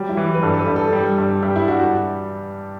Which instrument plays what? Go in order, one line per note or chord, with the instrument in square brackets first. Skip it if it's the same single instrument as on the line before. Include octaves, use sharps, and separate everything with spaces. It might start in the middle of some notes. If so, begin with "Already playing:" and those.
Already playing: [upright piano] F#3 [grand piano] G3
[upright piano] E4
[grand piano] E3
[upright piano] B4
[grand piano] G2 [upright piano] A4
[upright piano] A4
B4
[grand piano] G2
[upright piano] A4
[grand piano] G3
G2
[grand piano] G2 [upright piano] G4
[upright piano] E4
[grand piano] G2 [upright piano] F#4
[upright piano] F#4